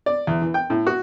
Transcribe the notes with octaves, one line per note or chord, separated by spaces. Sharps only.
D5
E2
E3
G5
A2
F#4